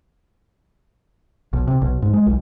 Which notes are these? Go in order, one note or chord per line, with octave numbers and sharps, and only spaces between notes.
B1
C3
B1
G#2
G#3
B1